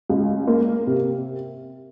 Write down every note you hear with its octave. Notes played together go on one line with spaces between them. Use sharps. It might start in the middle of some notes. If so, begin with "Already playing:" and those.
C#2
A#3
C3